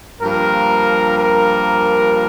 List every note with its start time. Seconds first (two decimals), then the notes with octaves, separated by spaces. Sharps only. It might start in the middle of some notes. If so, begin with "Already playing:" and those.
0.22 G2 F3 A#3 A#4
1.18 A#4